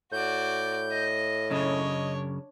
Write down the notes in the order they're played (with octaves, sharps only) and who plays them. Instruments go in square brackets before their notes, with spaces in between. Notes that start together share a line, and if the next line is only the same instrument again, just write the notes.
[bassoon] A2 [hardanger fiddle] F#4 D5 [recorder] G6
[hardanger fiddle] D#5
[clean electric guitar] F#2 C#3 [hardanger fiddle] D4 C#5 [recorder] D#5